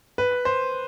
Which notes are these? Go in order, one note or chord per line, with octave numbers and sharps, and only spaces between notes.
B4
C5